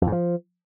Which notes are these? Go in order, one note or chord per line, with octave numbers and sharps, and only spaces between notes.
F2
G#2
F3